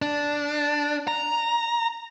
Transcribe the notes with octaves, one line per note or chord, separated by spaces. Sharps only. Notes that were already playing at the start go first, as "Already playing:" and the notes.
D4
A#5